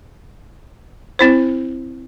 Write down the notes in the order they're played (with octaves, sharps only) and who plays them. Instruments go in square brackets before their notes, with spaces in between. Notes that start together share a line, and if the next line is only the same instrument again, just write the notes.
[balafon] C4 E4 C5